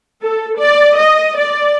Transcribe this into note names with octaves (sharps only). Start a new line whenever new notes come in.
A4
D5
D#5
D5